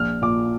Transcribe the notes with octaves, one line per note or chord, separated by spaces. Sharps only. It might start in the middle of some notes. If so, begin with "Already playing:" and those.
Already playing: A#1 F6
A#2 D6